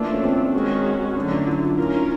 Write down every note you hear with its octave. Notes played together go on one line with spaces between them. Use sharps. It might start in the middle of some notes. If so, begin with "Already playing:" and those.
Already playing: E3 A3 A#3 D4 F4 A4
C#4
C4
D#3 G#3 C#4 F#4
D3 F#3 A3 C#4
D4
E4
F4
C#4 E4 F4 A#4
D#4